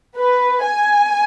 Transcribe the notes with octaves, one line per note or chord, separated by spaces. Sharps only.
B4
G#5